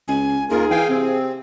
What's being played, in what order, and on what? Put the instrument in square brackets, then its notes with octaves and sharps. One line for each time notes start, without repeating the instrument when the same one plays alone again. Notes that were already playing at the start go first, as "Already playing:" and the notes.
[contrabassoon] C#2 [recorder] G#5
[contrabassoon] D#2 [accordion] F4 A#4 [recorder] G#4
[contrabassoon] E3 [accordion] F5 G5 G#5
[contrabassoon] C3 [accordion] C4